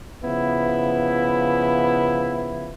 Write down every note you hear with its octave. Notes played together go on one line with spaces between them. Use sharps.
C#3 F3 B3 E4